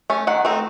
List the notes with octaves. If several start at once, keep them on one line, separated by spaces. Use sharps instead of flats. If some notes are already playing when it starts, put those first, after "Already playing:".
A3 C#4
D#3 F#5
A3 C4 D#4